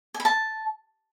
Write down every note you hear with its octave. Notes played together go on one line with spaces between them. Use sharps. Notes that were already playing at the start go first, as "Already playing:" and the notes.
G#5
B5
A5